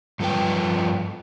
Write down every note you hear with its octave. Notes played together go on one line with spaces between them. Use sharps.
G2 F3 F4 A4 B4 G5